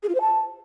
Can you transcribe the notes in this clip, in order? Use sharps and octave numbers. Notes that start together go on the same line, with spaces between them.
G#4
F4
C5
A5